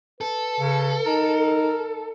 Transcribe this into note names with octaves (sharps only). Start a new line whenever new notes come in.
A4 B4
C#3
D#4 A#4